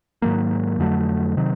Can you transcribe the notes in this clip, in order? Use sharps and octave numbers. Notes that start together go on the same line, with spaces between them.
G#2 D#3 F#3 A#3
F2 D3 F#3 A3
C3 D#3 F#3